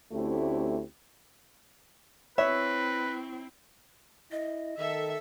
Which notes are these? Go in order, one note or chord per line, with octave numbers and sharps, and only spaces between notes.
D2 A3 C4 C#4 E4 G4
C4 E4 B4 C#5 E5
E4 D#5
D#3 A4 E5